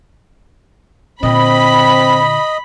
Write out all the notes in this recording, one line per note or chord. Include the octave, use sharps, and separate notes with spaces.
A#2 D3 C4 D#5 B5